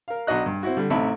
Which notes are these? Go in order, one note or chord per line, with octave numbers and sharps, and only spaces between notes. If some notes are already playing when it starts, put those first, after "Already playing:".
A#4 F5
B1 D4 F#4 D#5 F#6
G2
C4 E4 F#4
D3 G3
A1 C3 D#4 A4 E5 B5